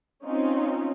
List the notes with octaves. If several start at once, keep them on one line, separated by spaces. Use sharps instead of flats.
C4 C#4 D#4 F4